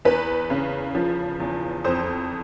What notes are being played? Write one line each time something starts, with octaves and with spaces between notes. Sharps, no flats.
E2 B4
C#3
F3
E2
F2 C5